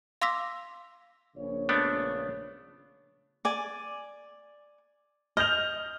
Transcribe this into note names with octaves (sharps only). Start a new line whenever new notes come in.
F5 C6 D6 E6 A#6 B6
A#1 C#3 C#5
A3 B3 D4
D5 G#5
D#5 F6 G6 F7